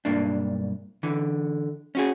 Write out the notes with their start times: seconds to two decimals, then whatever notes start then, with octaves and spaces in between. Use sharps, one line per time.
0.05 B1 G2 A#3 D4
1.03 D3 E3
1.95 C#4 F#4 G#4